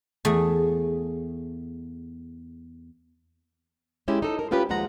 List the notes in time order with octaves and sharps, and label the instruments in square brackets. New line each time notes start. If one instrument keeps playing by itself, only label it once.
[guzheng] E2 A3 G#4
[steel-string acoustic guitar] G#3 C#4 E4 G4
D#4 A4
A#4
B3 C#4 F4 G4 B4
D#2 F3 G#3 F4 F#5 A#5